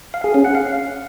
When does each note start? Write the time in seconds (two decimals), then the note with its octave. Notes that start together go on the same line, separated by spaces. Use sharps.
0.14 F5
0.24 G#4
0.34 C#4
0.45 F#5
0.55 F5